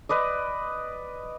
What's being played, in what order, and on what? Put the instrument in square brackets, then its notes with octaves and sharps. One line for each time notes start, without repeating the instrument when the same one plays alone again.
[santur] B4 D5 D#5